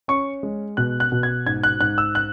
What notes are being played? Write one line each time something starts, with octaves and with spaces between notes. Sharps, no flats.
C#4 C#6
G#3
B2 F#6
F#6
B2
G#6
G#2 G#6
F#6
G#2 F#6
E6
F#6